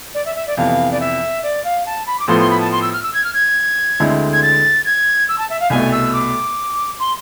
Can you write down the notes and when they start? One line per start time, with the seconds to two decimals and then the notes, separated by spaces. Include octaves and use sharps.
0.14 D5
0.25 E5
0.35 E5
0.46 D5
0.57 F2 C3 E3 B3 F5
0.91 D5
1.00 E5
1.43 D5
1.64 F5
1.86 A5
2.06 B5
2.19 D6
2.28 A2 F3 B3 C6
2.39 C6
2.50 B5
2.60 A5
2.71 C6
2.82 E6
2.93 F6
3.03 E6
3.13 G#6
3.23 F6
3.33 G#6
4.00 D2 D3 G#3 C4 E4
4.32 G#6
4.42 A6
4.85 G#6
5.28 E6
5.38 A5
5.49 E5
5.60 F5
5.70 C2 B2 A3 G#5
5.92 E6
6.13 D6
6.99 C6